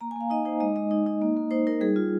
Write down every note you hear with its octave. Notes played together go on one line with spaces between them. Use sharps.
A#3 A#5
G#5
A#3 F5
D#4 D#5
D#4 C5
G#3 D#5
G#3 D#5
D#4
D#4
A#3
A#3
D#4 C5
D#4 A#4
G3 G#4
F4